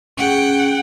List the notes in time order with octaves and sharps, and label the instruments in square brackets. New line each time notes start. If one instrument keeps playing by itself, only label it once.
[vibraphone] C#4 G#4 [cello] F#5 G5